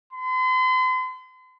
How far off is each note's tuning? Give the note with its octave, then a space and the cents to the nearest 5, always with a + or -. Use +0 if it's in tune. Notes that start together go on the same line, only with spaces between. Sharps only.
C6 -40